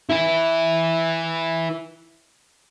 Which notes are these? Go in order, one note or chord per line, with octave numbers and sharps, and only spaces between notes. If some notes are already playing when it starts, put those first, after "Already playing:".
E4 B4